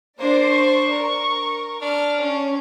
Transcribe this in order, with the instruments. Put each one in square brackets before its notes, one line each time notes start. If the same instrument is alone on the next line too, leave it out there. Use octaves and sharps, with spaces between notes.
[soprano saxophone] A#3 [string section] D4 C5 D5
[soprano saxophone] C#6
[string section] A#4
[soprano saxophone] D4 [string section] F6
[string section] C#4